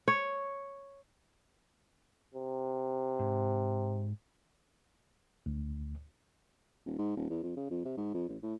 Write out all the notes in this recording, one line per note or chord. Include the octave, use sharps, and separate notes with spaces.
C#5
C3
G#2
D2
D#1
G#2
D#1
E2
F2
C#3
F2
C3
G#2
F2
A1
A2